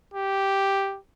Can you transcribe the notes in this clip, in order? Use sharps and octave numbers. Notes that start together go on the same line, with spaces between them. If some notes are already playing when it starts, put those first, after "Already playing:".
G4